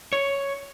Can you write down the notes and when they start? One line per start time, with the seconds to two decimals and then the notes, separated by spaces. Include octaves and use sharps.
0.13 C#5